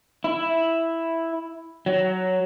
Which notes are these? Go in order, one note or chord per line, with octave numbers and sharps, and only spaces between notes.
E4
F#3